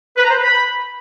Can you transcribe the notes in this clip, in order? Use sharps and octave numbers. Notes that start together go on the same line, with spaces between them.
B4
A#5
C5
B4
B5